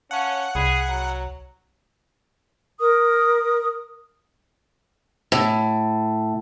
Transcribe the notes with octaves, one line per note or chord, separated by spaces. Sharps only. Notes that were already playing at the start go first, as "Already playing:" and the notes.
C#4 F5 F#5 A5 C#6
C2 G#4 B5 B6
F#3 A#5
A#4 D#6
A2